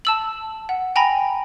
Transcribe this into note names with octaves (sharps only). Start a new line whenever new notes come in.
A5 E6 F#7
F#5
G5 G#5 A#5 B5 A#6